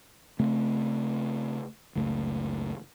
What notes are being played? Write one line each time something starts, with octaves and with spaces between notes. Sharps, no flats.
C#3 A3 C4
F#1 C#2 A3